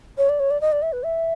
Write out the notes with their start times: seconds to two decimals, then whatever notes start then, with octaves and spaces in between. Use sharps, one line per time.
0.18 C#5
0.29 D5
0.40 C#5
0.51 D5
0.61 D#5
0.72 D5
0.82 E5
0.93 B4
1.04 E5